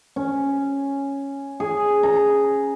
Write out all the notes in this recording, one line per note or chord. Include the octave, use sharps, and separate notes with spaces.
C#4
G#4
A#5